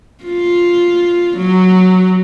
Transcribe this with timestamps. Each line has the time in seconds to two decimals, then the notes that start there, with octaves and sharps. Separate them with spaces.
0.24 F4
1.37 F#3